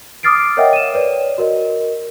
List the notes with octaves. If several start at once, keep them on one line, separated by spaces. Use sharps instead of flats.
D6 D#6 F6 A6 C7 D7
A#4 C#5 D#5 E5 F#5 G5
D#7 E7
B4 C#5 D5
F#4 A#4 D#5